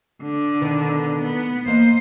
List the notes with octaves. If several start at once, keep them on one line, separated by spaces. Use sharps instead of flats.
D3
B2 D#3 B4
B3
E3 A#3 C5 D#5